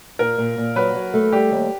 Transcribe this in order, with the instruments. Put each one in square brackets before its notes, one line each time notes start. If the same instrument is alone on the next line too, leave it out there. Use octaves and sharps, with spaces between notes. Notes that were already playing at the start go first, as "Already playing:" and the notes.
[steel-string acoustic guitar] A#2 [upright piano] A#4
[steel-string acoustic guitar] A#2
A#2
[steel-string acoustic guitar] F#3 [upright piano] B4
[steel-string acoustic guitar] F#3
A3
[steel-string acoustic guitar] G3 [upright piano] G4
[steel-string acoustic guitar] D#2